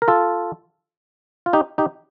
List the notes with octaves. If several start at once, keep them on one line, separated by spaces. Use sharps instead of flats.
A#4
F4 A4
F4
D#4 G4
D#4 G4